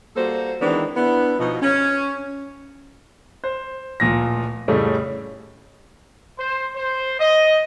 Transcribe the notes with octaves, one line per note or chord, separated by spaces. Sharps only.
G3 A#3 F#4 A4 C5
D#3 E3 G#3 B3 C4 D4
B3 D4 E4
B2 F3 D#4
C#4
C5
D1 A#2 F3 A#6
F2 A2 C#3 G3 A3
C5
C5
D#5